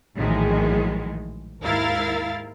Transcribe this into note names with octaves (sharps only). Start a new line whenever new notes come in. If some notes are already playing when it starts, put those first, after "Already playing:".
A#1 A2 D#3 E3 F#3 G#3
D#2 G#2 E4 A#4 F5 A6